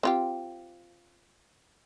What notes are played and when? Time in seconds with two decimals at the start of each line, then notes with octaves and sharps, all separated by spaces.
0.03 C4 F4 G4